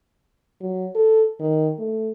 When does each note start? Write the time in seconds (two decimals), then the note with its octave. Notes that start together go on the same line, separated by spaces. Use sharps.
0.61 F#3
0.95 A4
1.40 D#3
1.79 A3